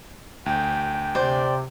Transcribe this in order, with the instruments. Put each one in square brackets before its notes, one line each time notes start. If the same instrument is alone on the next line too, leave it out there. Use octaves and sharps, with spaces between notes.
[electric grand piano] D2 [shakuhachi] G5
[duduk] C3 [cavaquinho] C5 D5